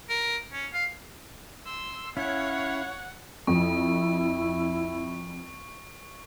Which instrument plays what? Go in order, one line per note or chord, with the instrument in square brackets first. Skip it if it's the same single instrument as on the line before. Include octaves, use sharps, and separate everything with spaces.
[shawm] A#4
C#4
F5
[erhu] C6 [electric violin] E6
[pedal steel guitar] C#4 E4 [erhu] C#5 [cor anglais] F5 [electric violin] F#5
[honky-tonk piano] F2 [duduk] E4 [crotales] C#6